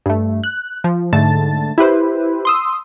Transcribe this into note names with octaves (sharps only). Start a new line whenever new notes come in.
G2 A3
F#6
F3
G#2 D3 A3 A5 A6
E4 G4 B4 C5
C6 D#6 E6